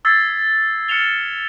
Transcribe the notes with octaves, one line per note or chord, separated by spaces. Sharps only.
D#6 E6 G#6 A6 B6 C7
F6 C#7 E7 F7 G7